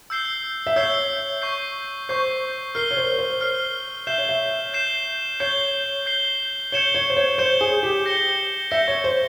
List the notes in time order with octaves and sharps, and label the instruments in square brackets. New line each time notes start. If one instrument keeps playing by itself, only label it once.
[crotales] E6 G6 C7 G7
[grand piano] E5
[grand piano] C#5 [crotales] E6 G6 C7 G7
[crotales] C#6 G6 C7
[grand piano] C5 [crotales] C#6 G6 C7
[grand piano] A#4 [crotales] F6 C7 G7
[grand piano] C#5
C5
A#4
C5
[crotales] F6 C7 G7
[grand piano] E5 [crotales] G6 C7 E7 G7
[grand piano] C#5
E5
[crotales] G6 C7 E7 G7
[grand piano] C#5 [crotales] G6 C7 G7
[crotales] G6 C7 G7
[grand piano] C#5 [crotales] G6 C#7 E7 G7
[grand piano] C#5
C5
C#5
[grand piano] C5 [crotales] G6 C#7 E7 G7
[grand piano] G#4
G4
[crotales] G6 A#6 C#7 G7
[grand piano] E5 [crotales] G6 A#6 C#7 G7
[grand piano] C#5
C5